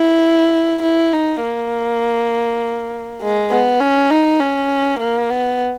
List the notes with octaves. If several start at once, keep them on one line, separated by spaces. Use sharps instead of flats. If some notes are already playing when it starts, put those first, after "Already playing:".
Already playing: E4
E4
D#4
A#3
G#3
B3
C#4
D#4
C#4
A#3
B3